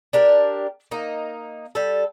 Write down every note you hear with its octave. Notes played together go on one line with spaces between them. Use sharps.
D4 G4 A#4
A#3 D#4
G3 A4